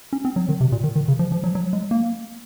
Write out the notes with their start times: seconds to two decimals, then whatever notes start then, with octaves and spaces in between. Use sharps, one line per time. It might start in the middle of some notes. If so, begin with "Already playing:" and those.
0.13 C#4
0.25 C4
0.36 F#3
0.49 D#3
0.61 C3
0.72 A#2
0.84 D#3
0.96 D#3
1.08 C#3
1.19 F3
1.32 F3
1.44 F#3
1.55 F#3
1.73 G#3
1.91 A#3